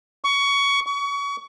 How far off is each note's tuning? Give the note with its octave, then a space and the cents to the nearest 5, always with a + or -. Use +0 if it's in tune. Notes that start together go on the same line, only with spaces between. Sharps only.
C#6 +20
C#6 +30